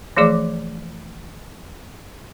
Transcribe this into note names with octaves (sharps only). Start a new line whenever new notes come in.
E3 F3 A3 G#4 D5 D6